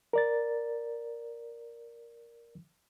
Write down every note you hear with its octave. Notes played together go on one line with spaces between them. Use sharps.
A#4 D5 A6